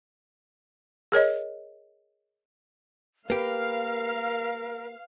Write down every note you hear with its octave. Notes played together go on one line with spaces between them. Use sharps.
G#4 A#4 C#5 D#5
A#3 G4 A#4 B4 F5